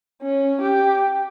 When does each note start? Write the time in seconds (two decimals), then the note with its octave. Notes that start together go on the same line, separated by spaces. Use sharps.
0.22 C#4
0.61 G4